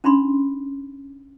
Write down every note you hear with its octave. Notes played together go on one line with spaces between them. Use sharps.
C#4 D4 E4 B5 C6